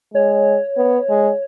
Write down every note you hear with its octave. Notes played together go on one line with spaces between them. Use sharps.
G#3 C#5
B3
G#3